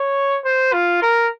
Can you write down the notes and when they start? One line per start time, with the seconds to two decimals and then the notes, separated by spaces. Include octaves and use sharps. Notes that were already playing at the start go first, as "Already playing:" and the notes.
Already playing: C#5
0.44 C5
0.73 F4
1.02 A#4